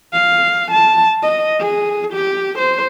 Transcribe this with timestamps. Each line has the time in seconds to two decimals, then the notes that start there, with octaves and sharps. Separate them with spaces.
0.13 F5
0.72 A5
1.23 D#5
1.60 G#4
2.13 G4
2.59 C5